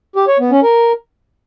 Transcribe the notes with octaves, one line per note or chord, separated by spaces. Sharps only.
G4
C#5
B3
C#4
A#4